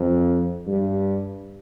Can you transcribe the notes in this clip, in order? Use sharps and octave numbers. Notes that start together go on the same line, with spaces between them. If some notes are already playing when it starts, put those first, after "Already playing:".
Already playing: F2
G2